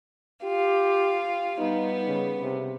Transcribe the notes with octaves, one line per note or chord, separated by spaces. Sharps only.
F4 G4
G3 B3 D#4
C#3
C3